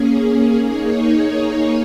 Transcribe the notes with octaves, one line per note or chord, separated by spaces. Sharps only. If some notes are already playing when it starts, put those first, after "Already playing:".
Already playing: A#3 C#4 G#4
A#3 D#4 G#4 C#5